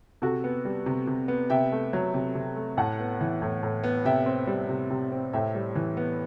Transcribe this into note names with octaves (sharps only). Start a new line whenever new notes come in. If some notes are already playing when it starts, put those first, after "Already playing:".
C3 F#4 A4
B3
G3
C3
C3
B3
C3 E5 G5
A3
F#3
C3
C3
A3
A2 F#5 A5
B3
E3
A2
A2
B3
C3 E5 G5
C4
G3
C3
C3
C4
A2 E5 G5
G3
E3
B3